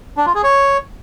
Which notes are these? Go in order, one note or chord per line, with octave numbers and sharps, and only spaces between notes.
D4
F4
G#4
C#5